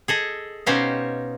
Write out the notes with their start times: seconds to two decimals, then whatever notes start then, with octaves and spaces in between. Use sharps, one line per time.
0.08 G#4 A4 D#5
0.66 B2 C#4 D#4 G4 C5 F5